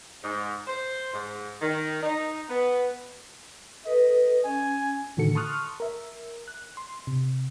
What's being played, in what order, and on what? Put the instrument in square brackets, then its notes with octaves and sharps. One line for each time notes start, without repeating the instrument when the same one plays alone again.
[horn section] G#2
C5
G#2
D#3
D#4
B3
[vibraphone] A4 B4 [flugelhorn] D#5
[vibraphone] C#4 [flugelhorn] G#5
[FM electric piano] A2 D3 D#3 F#4 A4 C#7
A5 C6 C#6 D#6 F6 F#6
A#4 E5
F#6
C6
C3